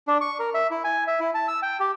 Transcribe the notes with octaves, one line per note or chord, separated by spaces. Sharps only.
D4
C#6
A#4
E5
E4
G#5
E5
E4
A5
E6
G5
G4